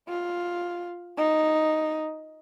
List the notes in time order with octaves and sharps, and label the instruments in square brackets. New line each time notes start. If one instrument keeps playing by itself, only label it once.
[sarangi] F4
D#4